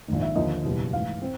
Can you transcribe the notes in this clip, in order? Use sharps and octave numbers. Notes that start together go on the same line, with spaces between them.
A#1 G#2 D#3
E5
D#2 D3 F3 A#3 D#4 D#5
F#1 E2 B2 G3
A1 G#2 E3 F5
C4